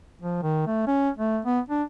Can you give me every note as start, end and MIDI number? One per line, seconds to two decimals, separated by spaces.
0.22 0.38 53
0.43 0.65 51
0.67 0.85 57
0.87 1.10 61
1.17 1.40 57
1.45 1.60 59
1.69 1.83 62